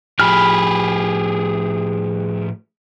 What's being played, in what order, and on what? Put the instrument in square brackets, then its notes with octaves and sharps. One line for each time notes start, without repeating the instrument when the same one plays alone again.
[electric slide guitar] A2 F3 [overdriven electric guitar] G4 G#4 [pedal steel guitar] B5 F6